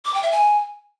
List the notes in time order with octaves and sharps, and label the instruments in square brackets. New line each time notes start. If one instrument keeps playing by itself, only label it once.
[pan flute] D6
G5
E5
G#5